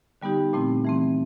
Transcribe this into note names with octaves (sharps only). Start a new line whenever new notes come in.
D3 G3 B3 D#4 G4
A#2 F3 A3 C4 E4
E3 A3 C4